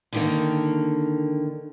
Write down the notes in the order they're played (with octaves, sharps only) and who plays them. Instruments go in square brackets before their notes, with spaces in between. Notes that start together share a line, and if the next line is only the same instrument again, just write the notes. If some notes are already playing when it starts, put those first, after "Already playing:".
[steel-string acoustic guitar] D3 D#3 A#3